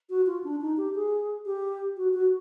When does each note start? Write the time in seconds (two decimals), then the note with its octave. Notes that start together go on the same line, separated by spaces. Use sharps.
0.10 F#4
0.27 F4
0.44 D4
0.61 D#4
0.77 G4
0.95 G#4
1.46 G4
1.97 F#4
2.14 F#4